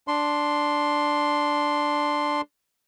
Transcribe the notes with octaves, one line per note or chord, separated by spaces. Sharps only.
D4 C6